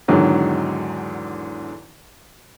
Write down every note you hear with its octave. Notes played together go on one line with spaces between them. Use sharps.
E2 G#2 D3 D#3 F#3